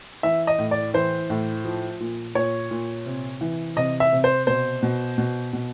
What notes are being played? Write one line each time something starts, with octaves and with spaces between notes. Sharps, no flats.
E3 E5
D#5
A2
D5
E3 C5
A2
F3
A#2
A#2 C#5
A#2
C3
E3
C3 D#5
E5
C3
C5
B2 C5
B2
B2
B2